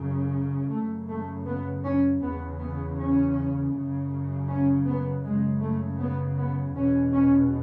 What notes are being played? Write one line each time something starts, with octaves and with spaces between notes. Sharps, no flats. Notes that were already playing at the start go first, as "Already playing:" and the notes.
Already playing: F#2 C#3
F#2 C#3 A3
A3
B3
C#4
E2 C#3 B3
B3
C#4
F#2 C#3
C#4
B3
F#2 C#3 G#3
A3
B3
B3
E2 B2 C#4
C#4